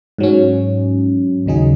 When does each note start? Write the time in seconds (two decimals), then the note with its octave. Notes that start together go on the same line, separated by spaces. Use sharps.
0.18 G#2 F#3 C#4
1.46 D#2 C#3 F#3 D#4 G#4